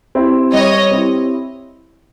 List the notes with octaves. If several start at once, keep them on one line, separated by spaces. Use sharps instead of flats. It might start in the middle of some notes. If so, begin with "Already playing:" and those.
C4 E4 G4
G3 C#5 D#5
C4 E4 G4